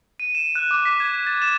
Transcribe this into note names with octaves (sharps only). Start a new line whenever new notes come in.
D#7
E7
F#6
D6
B6
G#6
A6
E7